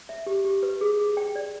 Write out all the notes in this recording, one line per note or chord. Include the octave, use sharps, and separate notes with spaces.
E5
G4
G4
B4
G#4
G#4
G5
D5